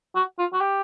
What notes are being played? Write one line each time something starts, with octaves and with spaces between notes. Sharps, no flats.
F#4
F4
F#4
G4